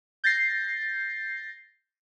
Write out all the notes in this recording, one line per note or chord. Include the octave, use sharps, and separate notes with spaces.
G6 A6 A#6 C7